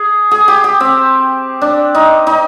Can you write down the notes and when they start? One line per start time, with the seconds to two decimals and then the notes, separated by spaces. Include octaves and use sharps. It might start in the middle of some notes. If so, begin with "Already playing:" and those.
Already playing: G#4
0.31 G#4
0.48 G4
0.64 G4
0.80 C4
1.62 D4
1.95 D#4
2.27 D#4